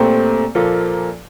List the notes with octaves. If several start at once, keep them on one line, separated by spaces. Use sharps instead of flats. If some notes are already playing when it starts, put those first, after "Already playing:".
Already playing: A#2 A3 C4 G4 C5
A#2 F3 A#3 F4 A4